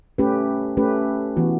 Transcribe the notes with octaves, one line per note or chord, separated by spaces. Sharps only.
A3 C#4 G4 B4
A3 C#4 G4 B4
E3 B3 F#4